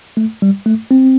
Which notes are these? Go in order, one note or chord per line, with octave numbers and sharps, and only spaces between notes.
A3
G3
A3
C4